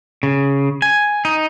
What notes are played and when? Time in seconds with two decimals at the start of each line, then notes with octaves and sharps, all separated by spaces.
0.23 C#3
0.82 G#5
1.25 D#4